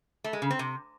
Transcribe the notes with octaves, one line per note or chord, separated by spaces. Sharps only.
A3
G#3
C#3
C4
C3